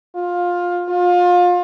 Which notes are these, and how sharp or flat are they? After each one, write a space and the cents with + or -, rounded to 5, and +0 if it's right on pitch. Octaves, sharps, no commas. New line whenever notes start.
F4 +15
F4 +25